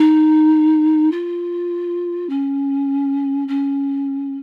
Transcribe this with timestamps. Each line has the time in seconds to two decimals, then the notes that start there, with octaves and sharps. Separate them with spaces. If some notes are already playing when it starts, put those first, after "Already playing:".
Already playing: D#4
1.12 F4
2.29 C#4
3.48 C#4